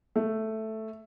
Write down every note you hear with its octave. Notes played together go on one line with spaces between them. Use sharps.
A3